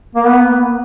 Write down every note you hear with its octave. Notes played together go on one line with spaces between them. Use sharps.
A#3
B3